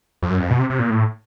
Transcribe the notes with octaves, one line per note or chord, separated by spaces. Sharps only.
F2
F#2
F2
B2
C3
C3
A#2
A2